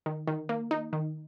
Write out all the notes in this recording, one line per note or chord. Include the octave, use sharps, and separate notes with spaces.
D#3
D#3
A#3
D#4
D#3